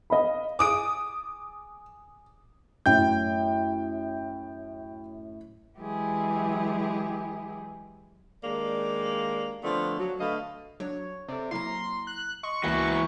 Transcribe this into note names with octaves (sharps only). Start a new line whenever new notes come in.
D#5 F5 B5
G#4 D6 D#6 D7
F#2 A2 G5 G6
E3 F#3 G#3 E4 G4 G#4
D#3 G#3 A#3 D4 G4 D5
D3 F3 A3 B3 C4 D4
F#3
D3 A3 B4 D#5 F5
F#3 D4 C#5
C3 A4 D5
F#3 A#3 E4 F5 A#5 C6
F#6
D#5 C6 C#6
C#2 E3 A#3 F#4 E5 G5